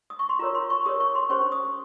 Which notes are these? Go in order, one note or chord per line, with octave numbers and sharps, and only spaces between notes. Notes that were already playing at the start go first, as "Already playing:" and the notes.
D#6
C#6
C6
F4 A#4 C#5 A#5
C6
C#6
G4 A#4 C#5 D#6
C#6
C6
C#4 G4 C5 C#6
D#6